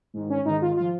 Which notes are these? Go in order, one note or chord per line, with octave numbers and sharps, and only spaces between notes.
G#2 D#3
C#4
G#2 D#3 D#4
F4
F3 F4